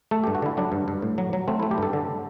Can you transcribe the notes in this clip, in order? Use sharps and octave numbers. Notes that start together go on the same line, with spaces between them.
A3 A4
G4
G2
F#4
D3 E4
F#3 D4
G2
G2
A2
F#3
F#3
A3 C4
E4
A3
G4
G2 A4
D3